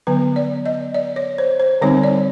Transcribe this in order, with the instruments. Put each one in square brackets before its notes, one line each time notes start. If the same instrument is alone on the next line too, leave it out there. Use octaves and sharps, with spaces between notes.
[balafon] D3 F#3 B3 B4
D5
D#5
D5
C#5
C5
C5
D3 G3 C4 D#4 C#5
D5